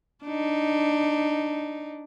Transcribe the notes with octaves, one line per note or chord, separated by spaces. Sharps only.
D4 D#4